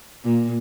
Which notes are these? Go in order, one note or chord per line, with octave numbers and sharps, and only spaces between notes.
A#2